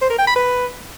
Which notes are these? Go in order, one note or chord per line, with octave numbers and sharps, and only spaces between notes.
C5
A#4
G5
B5
B4